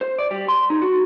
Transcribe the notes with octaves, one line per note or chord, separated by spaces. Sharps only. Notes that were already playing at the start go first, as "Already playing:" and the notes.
C5
D5
G3
C6
D#4
F#4